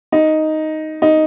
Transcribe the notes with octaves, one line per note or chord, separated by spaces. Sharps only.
D#4
D#4